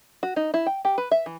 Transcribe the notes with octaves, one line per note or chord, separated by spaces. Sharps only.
F#4
D#4
E4
G5
G4
B4
E5
E3